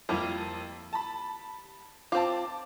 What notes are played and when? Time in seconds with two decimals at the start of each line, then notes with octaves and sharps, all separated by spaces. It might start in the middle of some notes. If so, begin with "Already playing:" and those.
0.09 F2 F3 G3 A#3 E4
0.93 A5 B5
2.12 C4 F4 A5 D6